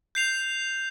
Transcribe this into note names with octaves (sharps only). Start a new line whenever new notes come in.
G6 C7 F7